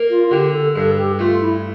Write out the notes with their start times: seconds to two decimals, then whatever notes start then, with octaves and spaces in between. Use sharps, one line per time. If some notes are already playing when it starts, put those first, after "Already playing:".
Already playing: A#3
0.10 F4
0.27 F4
0.31 D3 G4
0.53 A4
0.75 G2 A4
0.97 G4
1.19 A3 F4
1.41 E4